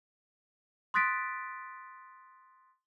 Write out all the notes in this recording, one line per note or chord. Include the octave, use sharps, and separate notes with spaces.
C6 D#6 F#6 A6 B6 D7